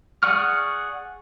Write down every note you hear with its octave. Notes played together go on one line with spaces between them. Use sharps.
G#4 D5 F#5 C#6 F6